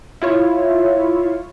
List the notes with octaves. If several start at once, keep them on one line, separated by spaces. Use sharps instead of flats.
E4 F4 C#5